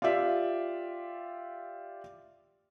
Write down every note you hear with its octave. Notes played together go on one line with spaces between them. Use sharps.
F4 G4 D5 E5